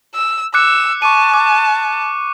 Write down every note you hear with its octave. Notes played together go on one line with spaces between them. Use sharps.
E6
D6 E6 F#6 C#7
A5 C#6 D6 D#7
D6